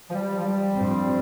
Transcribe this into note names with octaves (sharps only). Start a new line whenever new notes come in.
F3
G3
F3
G3
G2 F3 C4